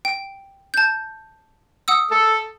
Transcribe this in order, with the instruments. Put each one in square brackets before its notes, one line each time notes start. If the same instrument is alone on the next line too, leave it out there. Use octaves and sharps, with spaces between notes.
[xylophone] G5
A5 G6
F#5 D#6 E6
[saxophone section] A4